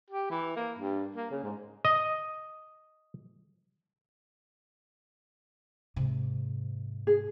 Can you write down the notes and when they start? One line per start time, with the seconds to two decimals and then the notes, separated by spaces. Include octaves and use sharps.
0.10 G4
0.30 E3
0.56 A#3
0.79 G2
1.16 A#3
1.31 C#3
1.43 G#2
1.85 D#5
5.96 G#2 C3
7.07 G#4